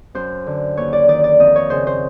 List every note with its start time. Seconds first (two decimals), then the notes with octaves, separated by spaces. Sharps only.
0.15 F#2 C5
0.47 D3
0.77 D#2 C#5
0.93 D5
1.08 D#3 D5
1.24 D5
1.40 F2 D#5
1.56 C#5
1.70 C#3 C5
1.87 C5